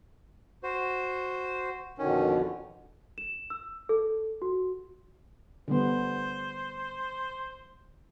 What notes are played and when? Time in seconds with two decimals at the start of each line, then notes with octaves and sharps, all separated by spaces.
0.63 F#4 C5
1.98 F2 B2 D3 D#3 C#4
3.18 E7
3.50 E6
3.89 A4
4.42 F#4
5.68 D3 G3 B3 C5